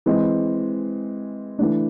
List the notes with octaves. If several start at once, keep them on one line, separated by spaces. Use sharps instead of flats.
E3 G#3 C4
E3 A3 D4